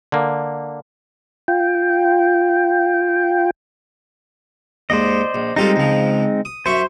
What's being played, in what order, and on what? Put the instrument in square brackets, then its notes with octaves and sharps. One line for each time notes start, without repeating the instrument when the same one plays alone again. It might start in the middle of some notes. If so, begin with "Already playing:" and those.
[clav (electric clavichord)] D3 A#3
[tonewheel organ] F4 G5
[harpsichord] D#2 G#2 [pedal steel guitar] C5 D5 D#5
[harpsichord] A#1
[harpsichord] G3 F4 A4 [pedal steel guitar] G#3 C4 D#4
[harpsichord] C#2 F3
D#6
[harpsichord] F#2 E5 C#6 [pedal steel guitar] C5